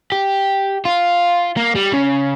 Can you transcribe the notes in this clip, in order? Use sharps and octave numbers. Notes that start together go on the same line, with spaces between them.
G4
F4
A#3
G3
C#3